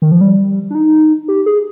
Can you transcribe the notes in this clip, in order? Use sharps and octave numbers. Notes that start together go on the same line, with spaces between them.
D#3
F3
G3
D4
D#4
G4
G#4